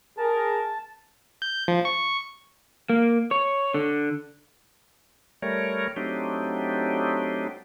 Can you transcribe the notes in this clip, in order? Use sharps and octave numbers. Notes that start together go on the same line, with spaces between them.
G#4 A#4 A5
G6
F3
C#6
A#3
C#5
D3
G3 A3 A#4 C#5
F#3 A3 C4 D4 D#4 G4